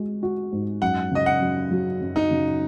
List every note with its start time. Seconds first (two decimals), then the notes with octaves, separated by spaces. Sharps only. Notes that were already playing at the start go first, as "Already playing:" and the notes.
Already playing: G#3 F#4
0.23 F#4
0.52 G#2
0.82 F#2 F#5
1.11 C#3 D#5
1.26 F#5
1.41 F#2
1.71 F#3
2.01 F#2
2.16 D#4
2.31 C#3